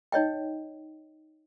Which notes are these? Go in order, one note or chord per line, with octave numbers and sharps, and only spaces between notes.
D#4 C#5 D#5 G5